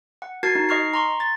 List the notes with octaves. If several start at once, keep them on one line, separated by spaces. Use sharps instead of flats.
F#5
F#4 A#4 A5 G#6 A6 C7
D#4
D#5 C#6 F6 C7
A#5 C6 C#6
A6